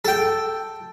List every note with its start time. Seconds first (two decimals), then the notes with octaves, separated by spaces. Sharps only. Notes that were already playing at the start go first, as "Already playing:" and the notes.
0.05 A4 G5